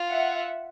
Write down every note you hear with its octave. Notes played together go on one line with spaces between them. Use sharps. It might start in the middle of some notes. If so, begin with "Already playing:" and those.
Already playing: F4
E5 F#5